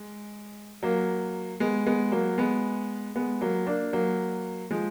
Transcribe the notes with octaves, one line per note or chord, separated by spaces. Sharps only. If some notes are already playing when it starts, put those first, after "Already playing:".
Already playing: G#3
F#3 A#3
G#3 B3
G#3 B3
F#3 A#3
G#3 B3
G#3 B3
F#3 A#3
A#3 D4
F#3 A#3
F3 G#3